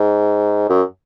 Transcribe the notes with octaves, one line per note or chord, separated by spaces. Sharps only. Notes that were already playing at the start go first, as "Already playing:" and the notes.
Already playing: G#2
F#2